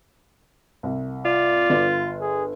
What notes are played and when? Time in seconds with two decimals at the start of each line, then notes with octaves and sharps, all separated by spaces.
0.83 C2
1.25 F4 D5
1.70 G1
2.21 G#4